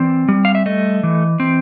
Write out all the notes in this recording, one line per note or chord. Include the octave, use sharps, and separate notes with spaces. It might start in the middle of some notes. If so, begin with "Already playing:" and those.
Already playing: E3 C4 D5
G3
F5
E5
A3 D#5
E3
C4